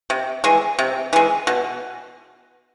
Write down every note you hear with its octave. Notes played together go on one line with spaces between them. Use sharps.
C3
E3 G#3
C3
E3 G#3
B2